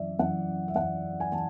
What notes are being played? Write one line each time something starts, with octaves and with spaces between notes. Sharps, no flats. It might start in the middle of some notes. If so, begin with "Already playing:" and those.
Already playing: F#2 E3 D5 E5
F#2 E3 F#5
E5
F#2 E3 F#5
G#5
E3 A5